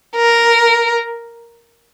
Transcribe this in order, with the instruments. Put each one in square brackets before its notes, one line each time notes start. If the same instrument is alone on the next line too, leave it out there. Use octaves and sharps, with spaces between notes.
[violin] A#4